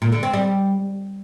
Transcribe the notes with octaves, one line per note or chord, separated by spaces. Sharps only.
A#2
D3
C4
G3